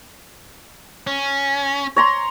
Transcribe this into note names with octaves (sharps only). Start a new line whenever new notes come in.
C#4
C#5 A#5 C6